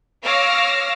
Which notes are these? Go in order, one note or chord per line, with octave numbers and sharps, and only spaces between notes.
C#5 F5 D6 E6 F6 A#6